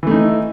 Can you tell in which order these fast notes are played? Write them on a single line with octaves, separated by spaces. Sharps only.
E3 A3 D#4